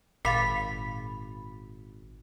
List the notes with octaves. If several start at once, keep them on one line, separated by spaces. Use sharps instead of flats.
G#1 A#2 F5 B5 A6